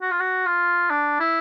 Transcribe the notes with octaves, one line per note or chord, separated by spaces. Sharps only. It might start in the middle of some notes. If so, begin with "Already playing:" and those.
F#4
F4
F#4
F4
D4
E4